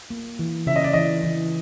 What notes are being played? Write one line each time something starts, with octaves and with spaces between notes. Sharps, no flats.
A#3
E3
C#3 E5
D#5
D5
E3 D#5
E3